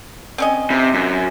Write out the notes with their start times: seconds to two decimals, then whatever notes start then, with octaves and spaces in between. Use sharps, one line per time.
0.38 C4 C#4 D#5
0.71 C3
0.94 F#2